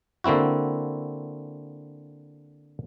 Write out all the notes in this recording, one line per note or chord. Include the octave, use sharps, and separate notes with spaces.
D3 A#3 C4 E4 F#4